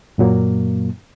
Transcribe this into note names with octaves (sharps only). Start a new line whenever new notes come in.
F#2 A#2 F#3 A#3